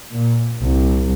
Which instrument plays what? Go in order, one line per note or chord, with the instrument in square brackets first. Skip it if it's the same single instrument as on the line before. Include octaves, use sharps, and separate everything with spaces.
[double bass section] A#2
C2